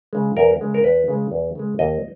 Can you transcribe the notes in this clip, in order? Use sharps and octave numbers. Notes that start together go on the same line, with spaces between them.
C#3 G#3
E2 A#4
C#3 G#3
A#4
E2 B4
C#3 G#3
E2
C#3 G#3
D#2 D#5